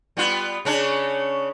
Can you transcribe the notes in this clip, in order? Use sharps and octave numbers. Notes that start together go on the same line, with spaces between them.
G3 B3 F4
C#3 C#4 D4